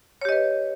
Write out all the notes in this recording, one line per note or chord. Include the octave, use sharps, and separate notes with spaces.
G4 B4 C#5 D#5